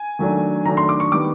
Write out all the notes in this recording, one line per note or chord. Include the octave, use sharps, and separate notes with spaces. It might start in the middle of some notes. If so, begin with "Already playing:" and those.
Already playing: G#5
D#3 F#3 A3 D4
D#3 F#3 A3 D4 A#5
C6
D6
C#6
D#3 G3 B3 D6